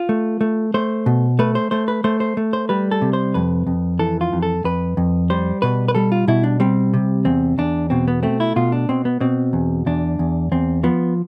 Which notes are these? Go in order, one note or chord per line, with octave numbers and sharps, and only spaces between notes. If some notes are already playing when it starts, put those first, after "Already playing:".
Already playing: F4
A3
A3
A3 C5
B2
A3 B4
C5
A3 C5
B4
A3 C5
C5
A3
C5
G3 B4
A4
C3
C5
F2 B4
F2
E3 A4
F4
F2
A4
F2 B4
F2
G3 C5
B2 B4
B4
G3 A4
F4
B2 E4
D4
G3 C4
C3
E2 C4
E2 D4
B2 C4
B3
A3 C4
E4
B2 F4
D4
B2 C4
B3
B2 C4
E2
E2 D4
E2
E2 C4
F3 B3